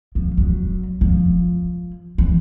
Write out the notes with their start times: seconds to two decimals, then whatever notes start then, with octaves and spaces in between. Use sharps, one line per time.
0.15 F3
0.37 F#3
1.01 F3
2.18 E3